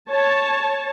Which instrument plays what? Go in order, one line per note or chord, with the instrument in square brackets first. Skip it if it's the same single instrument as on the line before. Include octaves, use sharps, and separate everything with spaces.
[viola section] C#5 A5